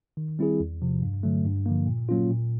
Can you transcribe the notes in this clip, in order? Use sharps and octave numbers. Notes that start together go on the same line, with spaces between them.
D#3
G3 C4 E4 G#4
E2
C3 F3
G2
D3 F#3 A3
G2
D3 F3 A#3
A#2
F#3 A#3 C#4 F4
A#2